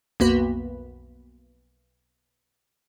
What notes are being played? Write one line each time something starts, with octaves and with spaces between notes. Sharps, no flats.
B1 F2 A#3 B3 F#4 B4